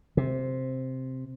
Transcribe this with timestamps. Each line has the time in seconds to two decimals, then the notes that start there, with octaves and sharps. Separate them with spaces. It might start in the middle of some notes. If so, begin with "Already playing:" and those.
0.17 C3